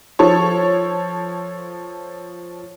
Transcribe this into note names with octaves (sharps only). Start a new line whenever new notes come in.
F3 A4 C#5